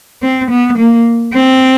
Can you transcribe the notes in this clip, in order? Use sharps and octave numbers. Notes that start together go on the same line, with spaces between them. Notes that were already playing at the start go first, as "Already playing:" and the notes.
C4
B3
A#3
C4